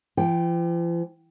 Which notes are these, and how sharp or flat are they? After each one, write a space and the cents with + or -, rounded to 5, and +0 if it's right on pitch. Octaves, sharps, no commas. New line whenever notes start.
F3 -45 G5 +0